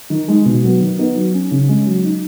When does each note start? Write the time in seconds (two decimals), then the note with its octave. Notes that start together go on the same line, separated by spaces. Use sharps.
0.10 D#3
0.28 G#3 D#4
0.45 B2
0.63 F#3 B3
0.80 D#3
0.98 B3 D#4
1.16 F#3
1.34 C#4
1.51 C#3
1.68 G#3 C#4
1.87 F#3
2.04 D#4